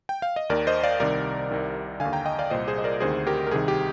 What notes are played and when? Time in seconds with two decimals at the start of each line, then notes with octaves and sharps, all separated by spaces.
0.09 G5
0.22 F5
0.36 D#5
0.50 D#2 D#3 A#4 D5
0.67 C5 D#5
0.83 D5 F5
1.00 C2 C3 D#3 A#4 D5
1.50 C2 C3 D#3
2.00 D3 F5 G#5
2.05 D#2
2.13 G5 A#5
2.26 D#5 G5
2.39 D5 F5
2.50 C2 A#2 C5 D#5
2.68 G#4 C5
2.78 D#5
2.84 A#4 D5
3.00 D2 C3 D#3 G#4 C5
3.27 G4 A#4
3.47 A#4
3.51 C2 C3 D#3 G#4
3.68 G4